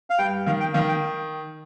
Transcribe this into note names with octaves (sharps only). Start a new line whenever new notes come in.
F5
G2 G5
D#3 F5
G5
D#3 F5
G5